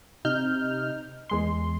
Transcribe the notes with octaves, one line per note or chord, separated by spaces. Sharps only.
C3 D#4 F6 G6
E2 G#3 C6